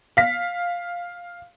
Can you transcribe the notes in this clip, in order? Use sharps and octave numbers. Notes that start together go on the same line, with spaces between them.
F5 B6